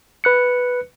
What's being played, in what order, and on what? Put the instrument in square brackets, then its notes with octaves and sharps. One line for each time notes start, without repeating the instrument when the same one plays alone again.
[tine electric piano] B4 F#6 C#7